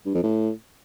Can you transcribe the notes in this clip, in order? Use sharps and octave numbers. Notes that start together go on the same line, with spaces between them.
G2
F2
A2